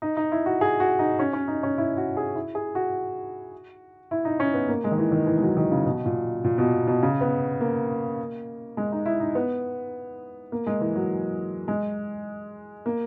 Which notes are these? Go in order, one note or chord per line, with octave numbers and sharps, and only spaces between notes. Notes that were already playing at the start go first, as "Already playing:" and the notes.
D#4
D#4
E4
F#4
G#4
F#4
D#4
C#4
C#4
D#4
C#4
E4
F#4
G#4
E4
G#4
F#4
E4
D#4
C#4
B3
A#3
G#3
D#3
E3
D#3
E3
G#3
F#3
D#3
C#3
B2
A#2
A#2
B2
B2
C#3
B3
A#3
G#3
D#4
E4
D#4
B3
A#3
G#3
E3
F#3
G#3
A#3